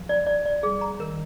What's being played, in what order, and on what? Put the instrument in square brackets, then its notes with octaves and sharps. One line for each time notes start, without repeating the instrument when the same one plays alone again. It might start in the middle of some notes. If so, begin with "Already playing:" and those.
Already playing: [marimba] F3
[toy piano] D5
D5
D5
[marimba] G3 [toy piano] G#4
[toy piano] A#5
[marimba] D#3 [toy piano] A#4